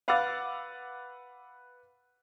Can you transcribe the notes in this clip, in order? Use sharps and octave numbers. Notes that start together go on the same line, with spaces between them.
B4 F5 F#5 D6 E6 A6